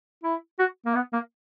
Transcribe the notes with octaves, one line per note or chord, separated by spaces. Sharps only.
E4
F#4
A#3
B3
A#3